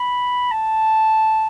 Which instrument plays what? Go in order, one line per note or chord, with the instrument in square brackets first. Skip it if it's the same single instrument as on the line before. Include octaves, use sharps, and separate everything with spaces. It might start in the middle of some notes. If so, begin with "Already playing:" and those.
Already playing: [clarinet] B5
A5